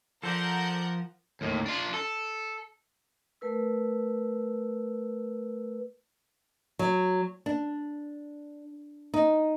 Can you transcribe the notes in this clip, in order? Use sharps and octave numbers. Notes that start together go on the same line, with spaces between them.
F3 A4 A#4 C5 D5 F#5 G6
D#2 A2
D4 F4
A4
A3 A#4 B4 E6
F#3
D4
D#4